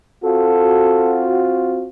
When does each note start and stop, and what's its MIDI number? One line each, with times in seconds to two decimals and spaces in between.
0.24 1.90 60
0.24 1.90 65
0.24 1.90 66
0.24 1.28 69